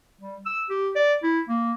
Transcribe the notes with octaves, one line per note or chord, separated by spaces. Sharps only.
G3
E6
G4
D5
E4
A#3